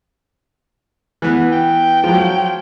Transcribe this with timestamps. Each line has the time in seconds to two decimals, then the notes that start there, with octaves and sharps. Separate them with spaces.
1.22 E3 B3
1.52 G5
2.04 F3 F#3